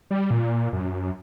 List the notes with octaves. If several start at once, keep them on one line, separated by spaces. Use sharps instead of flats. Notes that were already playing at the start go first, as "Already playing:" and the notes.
G3
A#2
F#2